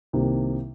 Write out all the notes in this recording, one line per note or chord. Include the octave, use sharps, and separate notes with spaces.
C2 C3 D#3 A#3